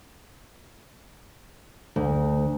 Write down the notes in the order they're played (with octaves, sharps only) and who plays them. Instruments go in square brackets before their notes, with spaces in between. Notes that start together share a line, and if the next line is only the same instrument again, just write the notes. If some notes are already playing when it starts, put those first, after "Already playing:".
[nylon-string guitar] D2